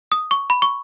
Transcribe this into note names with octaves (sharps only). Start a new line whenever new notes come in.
D#6
C#6
B5
C#6